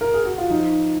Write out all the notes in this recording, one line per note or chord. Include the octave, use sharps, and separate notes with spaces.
A#4
G#4
F#4
F4
F3 D#4